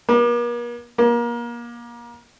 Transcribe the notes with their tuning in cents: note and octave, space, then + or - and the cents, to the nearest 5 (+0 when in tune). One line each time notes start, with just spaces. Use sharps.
A#3 +45
A#3 +30